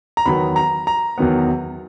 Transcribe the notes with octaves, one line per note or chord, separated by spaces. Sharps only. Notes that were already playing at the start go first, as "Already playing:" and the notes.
A#5
E2 D#3 F#3 B3 B5
A#5
A#5
E2 D#3 F#3 B3